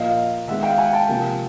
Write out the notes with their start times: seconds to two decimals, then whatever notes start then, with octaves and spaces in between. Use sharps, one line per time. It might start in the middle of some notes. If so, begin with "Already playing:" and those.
Already playing: A#2 F3 A#3 D#5 F5
0.48 D#3 G#3 B3 E5 F#5
0.63 F5 G5
0.78 F#5 G#5
0.93 G5 A5
1.08 C3 F3 A#3